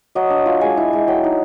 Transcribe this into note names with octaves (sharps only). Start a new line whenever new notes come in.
F#3 D#5
D4
F4
G#3 G#5
E4
G#3
F#3 G5
D#4